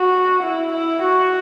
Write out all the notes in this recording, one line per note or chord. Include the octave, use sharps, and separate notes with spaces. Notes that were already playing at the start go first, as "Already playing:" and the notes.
Already playing: F#4
E4
E4
F#4